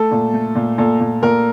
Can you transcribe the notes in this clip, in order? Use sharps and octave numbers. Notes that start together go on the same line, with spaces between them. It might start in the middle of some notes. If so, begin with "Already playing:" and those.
Already playing: A3 A4
A#2
A3
A#2
A#2 A4
A#2
A#2 A#4